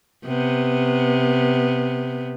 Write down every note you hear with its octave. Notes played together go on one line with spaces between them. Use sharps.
C3 B3